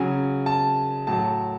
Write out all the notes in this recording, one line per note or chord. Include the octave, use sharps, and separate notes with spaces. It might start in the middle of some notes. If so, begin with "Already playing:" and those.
Already playing: C#3 F#3 G#5
A5
A2 F#3 A5